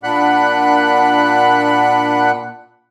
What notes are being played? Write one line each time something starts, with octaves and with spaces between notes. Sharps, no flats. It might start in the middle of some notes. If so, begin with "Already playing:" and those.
A#2 D4 F#5 B5 F#6